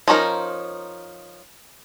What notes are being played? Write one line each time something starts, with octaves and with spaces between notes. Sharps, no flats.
F3 C#4 D#4 A#4